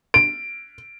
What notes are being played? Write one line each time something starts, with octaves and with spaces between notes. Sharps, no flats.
D7